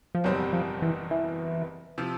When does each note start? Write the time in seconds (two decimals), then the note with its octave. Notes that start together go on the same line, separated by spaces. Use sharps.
0.15 F3
0.24 F#1 E2 B2 F#3 G3 C4
0.53 F3
0.82 E3
1.11 E3
1.98 C3 F3